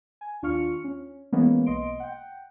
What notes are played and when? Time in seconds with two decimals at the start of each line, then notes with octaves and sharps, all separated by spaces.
0.21 G#5
0.42 D#2 D4 F4 C#6 F6 C#7
0.84 C#4
1.32 E3 G#3 A#3 B3 C#4
1.66 B1 D#5 C6 D7
2.00 F#5 G5